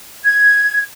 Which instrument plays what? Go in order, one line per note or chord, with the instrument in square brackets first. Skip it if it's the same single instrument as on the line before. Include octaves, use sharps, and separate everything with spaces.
[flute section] G#6